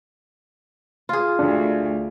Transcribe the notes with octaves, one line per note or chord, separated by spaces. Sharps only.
F4 G#4
D2 D4